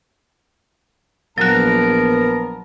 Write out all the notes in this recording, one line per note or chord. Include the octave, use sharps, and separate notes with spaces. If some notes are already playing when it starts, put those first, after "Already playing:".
A#1 F#3 B3 A#4 A5 F#6